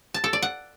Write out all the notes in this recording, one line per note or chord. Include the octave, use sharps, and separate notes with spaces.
A5
A4
D5
F#5